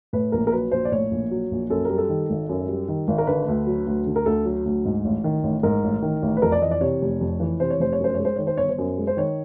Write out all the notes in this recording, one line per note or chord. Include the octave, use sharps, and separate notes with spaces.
A2 B4
A#1 A#4
A#4
F#3 B4
A#1 C5
D5
A2 C#5
A#1
F#3
A#1
F#2 A4
G3 A#4
A4
D#3
G#1
F#2
G3
D#3
G#1
A#4
D3 B4
D2
F#3
D2
D3
A#4
D2 A4
F#3
D2
G#2
A1
D#3
A1
G#2 A#4
A1
D#3
A1
B4
F2 A#4
D5
E3 D#5
D5
C3 C#5
F1
F2
E3
C3 C5
C#5
F1 C5
C#5
F#2 C5
G#3 C#5
C5
D#3 C#5
C5
G1 C#5
C5
F#2
G#3
C5
D#3 C#5